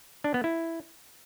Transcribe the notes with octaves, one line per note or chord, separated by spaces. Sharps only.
D4
B3
E4